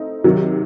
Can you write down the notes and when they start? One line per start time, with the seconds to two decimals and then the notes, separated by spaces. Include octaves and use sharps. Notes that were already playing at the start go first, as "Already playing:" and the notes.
Already playing: A3 C4 D#4
0.24 C3 D#3 F#3